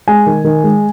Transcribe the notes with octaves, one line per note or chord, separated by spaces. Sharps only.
G#3 G#5
D#3
D#3
G#3